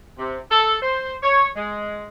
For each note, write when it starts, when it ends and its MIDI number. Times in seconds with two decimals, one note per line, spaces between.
0.18 0.38 48
0.50 0.76 69
0.82 1.14 72
1.22 1.45 73
1.56 2.08 56